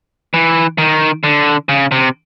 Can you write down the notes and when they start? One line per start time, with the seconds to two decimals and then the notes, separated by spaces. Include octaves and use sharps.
0.34 E3
0.78 D#3
1.24 D3
1.69 C#3
1.92 C3